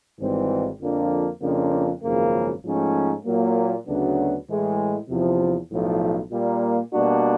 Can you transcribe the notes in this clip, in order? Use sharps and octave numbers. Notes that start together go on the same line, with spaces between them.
G#1 G#2 E3 G3 C4
F2 D3 F3 A#3 D4
F2 C#3 F3 A#3 D4
G#1 F#2 C#3 F3 A#3
G#2 F3 A3 C#4
A#2 F#3 A#3
D2 C#3 F#3 B3 D4
A2 E3 G#3
E2 C3 F3
B1 A2 F3
A#2 G3 A#3
B2 G3 A#3 D4 F#4